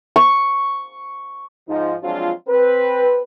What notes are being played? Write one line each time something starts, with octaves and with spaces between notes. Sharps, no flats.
C#6
G#2 F3 D#4
F3 F#3 G#3 C4 D4 F4
C4 B4